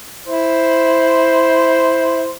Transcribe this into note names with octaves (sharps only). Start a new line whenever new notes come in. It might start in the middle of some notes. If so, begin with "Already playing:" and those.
E4 C5